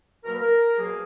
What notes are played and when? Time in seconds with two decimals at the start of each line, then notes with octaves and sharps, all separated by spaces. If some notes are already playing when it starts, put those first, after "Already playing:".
0.24 B2 F#3 A#3 A#4
0.32 B4
0.41 A#4
0.76 B2 F#3 A#3 G#4